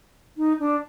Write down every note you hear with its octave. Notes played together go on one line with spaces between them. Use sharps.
D#4
D4